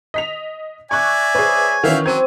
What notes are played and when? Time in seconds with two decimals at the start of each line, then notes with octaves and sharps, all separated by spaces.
0.14 D#5 B6 F7
0.91 D5 E5 G#5 C#6 F#6
1.34 G#4 B4 C#5
1.84 D#3 E3 C#4 F#4 E5 F5
2.06 F#3 C4 D6 G#6 D#7